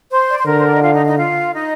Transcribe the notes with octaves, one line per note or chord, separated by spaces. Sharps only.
C5
D5
C5
D3 A#4
C5
D5
D#5
F4 F5
D#4 D#5
D#4 D#5
F4 F5
D#4 D#5